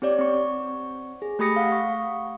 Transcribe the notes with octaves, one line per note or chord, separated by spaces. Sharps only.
C4 G4 C#5 D5
C4 C#6
G#4
A3 G4 B5 D#6 A#6 C#7
F5 F#5
C#6